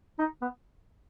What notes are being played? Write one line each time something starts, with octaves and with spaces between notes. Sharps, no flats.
D#4
B3